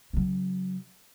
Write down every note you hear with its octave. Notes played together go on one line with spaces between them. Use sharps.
C#3 F#3